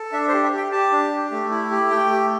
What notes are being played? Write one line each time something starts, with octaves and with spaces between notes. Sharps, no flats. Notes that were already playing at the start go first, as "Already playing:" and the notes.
Already playing: A4
D4 E5
C5
G4
E5
G4
G5
G4 A5
D4
G4
A3
E4
G4
A3 G5
G4